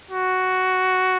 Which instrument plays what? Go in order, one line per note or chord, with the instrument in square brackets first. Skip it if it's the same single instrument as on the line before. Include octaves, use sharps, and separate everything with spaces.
[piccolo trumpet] F#4